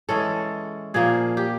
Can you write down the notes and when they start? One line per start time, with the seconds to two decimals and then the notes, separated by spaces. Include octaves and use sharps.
0.09 E3 G#3 C#4 A4
0.94 A#2 F3 A#3 G#4
1.37 G4